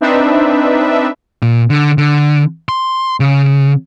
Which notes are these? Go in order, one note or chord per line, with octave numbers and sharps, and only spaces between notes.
C4 D4 D#4 B4 E5
A#2
D3
D3
C6
C#3